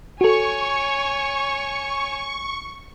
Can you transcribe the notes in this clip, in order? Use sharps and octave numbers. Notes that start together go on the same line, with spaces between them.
F#4 A4 C#5 G#5 C#6